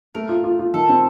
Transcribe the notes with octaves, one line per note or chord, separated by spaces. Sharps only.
A3 A#4
F4
F4
F4
D#3 A4
C4